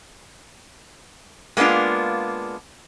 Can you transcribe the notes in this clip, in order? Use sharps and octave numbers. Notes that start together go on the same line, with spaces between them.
G#3 A#3 B3 D4 F4